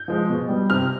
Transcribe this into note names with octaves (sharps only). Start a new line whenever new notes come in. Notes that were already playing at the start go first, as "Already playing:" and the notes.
Already playing: G6
F3 G#3
B2
G3
C3 F6